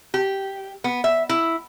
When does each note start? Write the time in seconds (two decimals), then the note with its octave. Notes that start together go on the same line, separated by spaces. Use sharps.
0.14 G4
0.84 B3
1.04 E5
1.29 E4